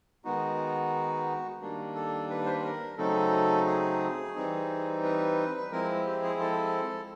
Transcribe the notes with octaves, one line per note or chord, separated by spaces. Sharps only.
D#3 G#3 B3 D#4 F#4
D#3 G3 A#3 D4
A4
B4
C5
B4
A#4
C#3 F#3 A3 C4 D#4 A4
G#4
E3 G3 C4 D#4
B4
F3 G#3 C4 E4 A#4
G4
G#4
A4